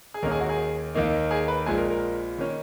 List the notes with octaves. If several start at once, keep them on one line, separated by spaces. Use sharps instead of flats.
G#4
D#2 D#3 A#3 C#4 A#4
G#4
F#4
G#4
D#2 D#3 A#3 D#4
G#4
B4
A#1 A#2 G#3 G#4
A#4
A#4
D#3 A#3 C#4